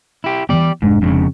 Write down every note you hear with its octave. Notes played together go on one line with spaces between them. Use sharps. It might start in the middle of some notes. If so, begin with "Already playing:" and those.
E4 G4
E3 F3 B3 G4 D5
F1 G#2 G#3 D4
F2 A2 C#3